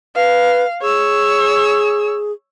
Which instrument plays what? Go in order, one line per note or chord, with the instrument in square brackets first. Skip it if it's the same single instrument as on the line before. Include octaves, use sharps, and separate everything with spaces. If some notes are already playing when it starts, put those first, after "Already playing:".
[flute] B4 [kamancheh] F5
[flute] G#4 [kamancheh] C#5 E6